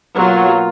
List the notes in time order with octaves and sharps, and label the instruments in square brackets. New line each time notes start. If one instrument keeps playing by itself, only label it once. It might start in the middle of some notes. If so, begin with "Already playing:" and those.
[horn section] B2 A#3 F4 [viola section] F#3